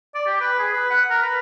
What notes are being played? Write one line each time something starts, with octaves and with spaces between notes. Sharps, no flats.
D5
G4
B4
G#4
B4
F#5
A#4
B4